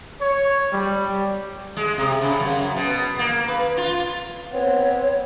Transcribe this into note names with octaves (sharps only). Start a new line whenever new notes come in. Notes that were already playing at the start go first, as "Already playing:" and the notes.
C#5
G3
G#3
C3
C#3
F#2
B2
A#3
B4
F4
B3 C4 C#5